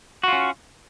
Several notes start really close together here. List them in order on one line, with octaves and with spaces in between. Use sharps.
F#4 F4 C#4